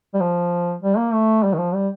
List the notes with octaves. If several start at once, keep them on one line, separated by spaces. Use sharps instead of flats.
G3
F3
G3
A#3
A3
G3
D#3
F3
G3